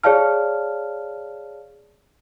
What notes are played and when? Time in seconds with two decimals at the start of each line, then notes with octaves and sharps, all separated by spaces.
0.04 G#4 C#5 D5 F5 A5 F6